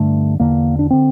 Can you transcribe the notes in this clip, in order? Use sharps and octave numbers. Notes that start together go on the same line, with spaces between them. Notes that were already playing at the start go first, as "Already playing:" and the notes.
Already playing: G2 D3 A3
E2 D3 A#3
D4
D3 C4